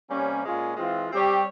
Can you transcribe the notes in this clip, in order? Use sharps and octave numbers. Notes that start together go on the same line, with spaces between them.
C3 G3 A#3 C#4
A#2 G#3 C#4 F4
E3 G#3 C4 F4
G3 C4 G4 C#5